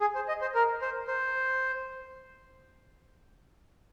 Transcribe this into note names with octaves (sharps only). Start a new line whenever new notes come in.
G#4
C5
D#5
C5
A#4
C5
C5